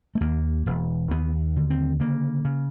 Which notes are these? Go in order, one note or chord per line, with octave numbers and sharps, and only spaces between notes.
A3
D#2 A#3
E1
D#2 B3
D3
C4
C#3 A#3
C#3